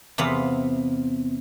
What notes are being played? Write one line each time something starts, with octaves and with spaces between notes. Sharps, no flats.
E2 C3 B3 F5